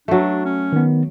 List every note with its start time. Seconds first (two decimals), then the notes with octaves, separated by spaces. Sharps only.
0.08 F#3 A3 D4
0.45 C#4
0.72 D#3 B3